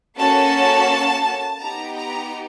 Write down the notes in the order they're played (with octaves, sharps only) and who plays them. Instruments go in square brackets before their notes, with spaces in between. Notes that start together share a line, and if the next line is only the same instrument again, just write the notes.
[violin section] A#3 C#4 F#4 A4 A5
B3 D#4 G4 A#5
A#5